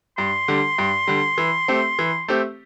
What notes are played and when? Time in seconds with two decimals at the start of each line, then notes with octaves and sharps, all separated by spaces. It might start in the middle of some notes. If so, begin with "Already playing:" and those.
0.18 G2 C6
0.48 D3 G3
0.78 G2
1.07 D3 G3
1.38 E3
1.68 A3 C4 G4
1.99 E3
2.28 A3 C4 G4